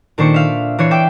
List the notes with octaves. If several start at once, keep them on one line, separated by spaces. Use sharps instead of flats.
A#2 D#3 D4 C5 C#6 D6
E5 F5
E3 D4 C#5 C7
E5 G5 D6